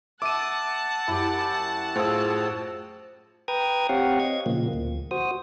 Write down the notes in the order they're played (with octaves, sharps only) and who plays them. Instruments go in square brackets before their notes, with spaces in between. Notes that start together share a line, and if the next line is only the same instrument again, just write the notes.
[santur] E5 [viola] F#5 A5 [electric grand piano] D6 D#7
[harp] F#2 [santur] E4 G4
[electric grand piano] A2 [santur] F3 E6 [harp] G#4
[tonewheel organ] B4 G5 A#5 D#6 G#6
C4 G4 C#5 F5 F#5
D#5 G#6
A#2 C#3 F3 A#3
D2
F#4 C5 D#6